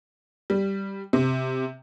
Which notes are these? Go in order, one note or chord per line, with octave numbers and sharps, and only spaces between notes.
G3
C3